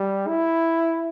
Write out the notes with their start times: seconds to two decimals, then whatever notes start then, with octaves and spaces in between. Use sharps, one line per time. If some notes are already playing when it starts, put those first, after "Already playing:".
Already playing: G3
0.28 E4